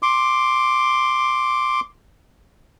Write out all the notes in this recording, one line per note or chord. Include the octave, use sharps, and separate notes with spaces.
C6 D6